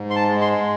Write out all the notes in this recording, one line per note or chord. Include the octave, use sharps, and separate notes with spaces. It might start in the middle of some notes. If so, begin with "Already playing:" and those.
Already playing: G#2
C6
A5
G#3
C6